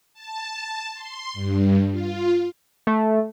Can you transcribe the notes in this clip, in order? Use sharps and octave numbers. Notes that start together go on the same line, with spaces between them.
A5
C6
G2
F4
A3